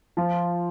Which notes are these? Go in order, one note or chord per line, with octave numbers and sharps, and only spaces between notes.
F3 F4